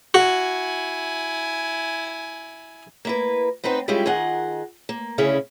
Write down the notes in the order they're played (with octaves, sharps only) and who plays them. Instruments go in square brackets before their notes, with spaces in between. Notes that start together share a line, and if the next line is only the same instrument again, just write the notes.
[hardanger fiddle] E4 G#5 [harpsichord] F#4
[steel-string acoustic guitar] A#3 E4 B4
B3 C4 D#4 B4 C5
G3 G#3 C#4 E4 F4 G4
D#3 F4 G#4 D#5 F#5
A#3
D2 C#3 C#4 E4 G#4